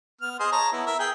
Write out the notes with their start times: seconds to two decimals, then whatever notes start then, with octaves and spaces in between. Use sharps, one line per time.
0.21 B3 F6
0.40 G#4 C5 D#5
0.52 C#5 A5 A#5
0.72 B3 E4
0.86 A#4 E5
0.99 G#4 G5